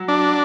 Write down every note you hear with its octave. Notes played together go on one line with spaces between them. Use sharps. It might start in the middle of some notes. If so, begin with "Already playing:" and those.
Already playing: F#3
D4